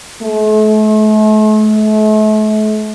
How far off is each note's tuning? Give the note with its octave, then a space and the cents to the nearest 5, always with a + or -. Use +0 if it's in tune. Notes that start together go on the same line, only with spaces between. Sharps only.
A3 -40